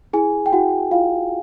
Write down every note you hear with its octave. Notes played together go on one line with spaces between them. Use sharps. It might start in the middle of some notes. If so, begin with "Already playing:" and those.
E4 G#4 G#5
G5
E4 F#4 F#5
E4 F4 F5